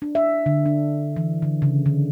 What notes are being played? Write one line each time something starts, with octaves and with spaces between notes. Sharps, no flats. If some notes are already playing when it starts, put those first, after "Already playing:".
D4
E5
D3
D4
E3
D3
C#3
D3